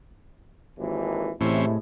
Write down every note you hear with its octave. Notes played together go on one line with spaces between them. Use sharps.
G#1 D#2 E3
A2 C3 E3 G#3 C4 C#4 E4